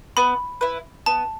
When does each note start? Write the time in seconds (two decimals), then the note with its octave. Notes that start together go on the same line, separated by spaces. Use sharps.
0.17 B3 B5
0.61 E4 B4
1.06 B3 A5